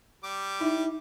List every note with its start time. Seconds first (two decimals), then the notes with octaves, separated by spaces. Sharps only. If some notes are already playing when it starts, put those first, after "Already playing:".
0.24 G3 D6
0.61 D#4 E4